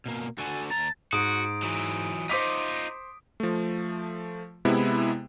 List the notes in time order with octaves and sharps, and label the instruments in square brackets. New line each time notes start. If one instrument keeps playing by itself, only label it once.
[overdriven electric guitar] B2 A#3
[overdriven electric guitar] D3 F#4 [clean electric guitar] A4 G#5 A5
[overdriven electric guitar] D#2 A#5 [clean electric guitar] A5
[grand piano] G#2 [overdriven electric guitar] F#4 [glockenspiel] D#6 D7
[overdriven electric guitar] E3 F#3
[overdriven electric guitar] D#4 F4 [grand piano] C5 D6 B6
[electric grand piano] F3 A3
C3 G#3 B3 E4